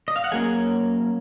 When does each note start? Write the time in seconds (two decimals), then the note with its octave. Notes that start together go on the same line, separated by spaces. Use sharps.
0.08 D#5
0.16 F5
0.24 F#5
0.32 F#3 A#3 C#4 G#4 G#5